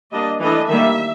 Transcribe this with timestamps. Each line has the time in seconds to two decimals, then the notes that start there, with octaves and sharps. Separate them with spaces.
0.12 G3 A#3 D4 D#5
0.40 E3 A3 D4 D#5
0.68 D#3 G3 A#3 E5